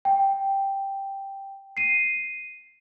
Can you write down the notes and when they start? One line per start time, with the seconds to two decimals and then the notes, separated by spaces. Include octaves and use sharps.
0.05 G5
1.77 C7 D#7